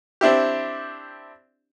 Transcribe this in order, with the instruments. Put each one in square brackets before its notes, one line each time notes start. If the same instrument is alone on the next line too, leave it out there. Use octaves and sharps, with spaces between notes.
[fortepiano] C4 D4 E4 G4